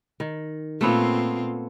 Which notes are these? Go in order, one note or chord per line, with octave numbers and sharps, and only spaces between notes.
D#3
A#2 A3 B3 C4 F4 C#5